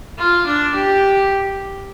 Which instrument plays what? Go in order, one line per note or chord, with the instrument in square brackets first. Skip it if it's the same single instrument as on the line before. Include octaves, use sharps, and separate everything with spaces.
[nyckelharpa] F4
D4
G4